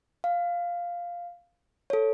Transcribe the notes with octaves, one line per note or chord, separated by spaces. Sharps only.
F5
A4 C#5